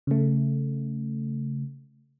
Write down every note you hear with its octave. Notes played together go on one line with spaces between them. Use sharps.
C#3 A3